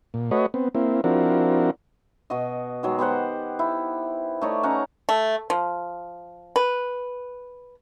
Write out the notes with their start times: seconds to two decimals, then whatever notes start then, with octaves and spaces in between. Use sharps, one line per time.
0.14 A#2
0.31 A3 F#4 B4 C#5 D#5
0.54 B3 C4
0.75 A#3 C4 E4
1.04 F3 C4 D4 E4 F#4 A#4
2.30 B2 F#4 D#5
2.83 D#3 F#3 G#3
2.99 B3 G4 C5 F#5
3.59 E4
4.41 A3 D#4 C#5 D5
4.63 C#4 D#4 F#5 A#5
5.09 A3
5.50 F3
6.56 B4